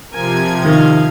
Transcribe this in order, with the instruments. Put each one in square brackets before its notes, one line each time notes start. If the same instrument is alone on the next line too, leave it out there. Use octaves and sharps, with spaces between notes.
[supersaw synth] C3 F3 G#6 [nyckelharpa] A#4 G#5
[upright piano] D#3 [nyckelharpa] D#5 F5